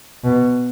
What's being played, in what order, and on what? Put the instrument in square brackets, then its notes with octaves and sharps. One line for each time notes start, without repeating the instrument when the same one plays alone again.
[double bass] B2